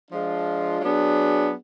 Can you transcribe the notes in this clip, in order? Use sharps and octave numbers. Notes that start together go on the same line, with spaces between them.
F3 G#3 D4 F4
F#3 B3 D4 G#4